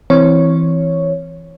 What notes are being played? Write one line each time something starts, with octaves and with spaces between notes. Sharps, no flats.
E3 C4 C#5